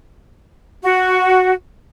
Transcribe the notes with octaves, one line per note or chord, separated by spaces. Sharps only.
F#4